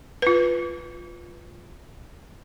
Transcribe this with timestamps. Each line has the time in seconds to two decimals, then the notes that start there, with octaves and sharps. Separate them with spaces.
0.22 F4 B4